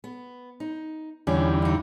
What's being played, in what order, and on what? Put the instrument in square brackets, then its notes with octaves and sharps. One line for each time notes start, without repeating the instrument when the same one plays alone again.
[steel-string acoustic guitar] B3
D#4
[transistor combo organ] E2 D3 G3 [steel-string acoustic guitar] C#4 D#4
[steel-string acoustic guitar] G2 D#4